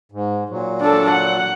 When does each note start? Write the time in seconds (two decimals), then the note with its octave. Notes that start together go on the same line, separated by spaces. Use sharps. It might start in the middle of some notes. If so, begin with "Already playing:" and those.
0.12 G#2
0.49 A#2 F#3
0.81 D4 A4
1.11 F#5